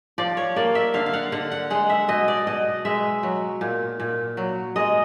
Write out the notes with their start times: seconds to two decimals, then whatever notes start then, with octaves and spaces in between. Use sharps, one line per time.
0.18 F3 D5
0.37 C#5
0.56 A#3 D5
0.75 E5
0.94 D3 F5
1.06 F5
1.13 F#5
1.32 D3 F#5
1.51 F#5
1.70 G#3 F#5
1.90 E5
2.09 B2 D#5
2.28 D5
2.47 B2 D#5
2.85 G#3 E5
3.23 F#3
3.61 A#2
4.00 A#2
4.37 F#3
4.76 G#3 D#5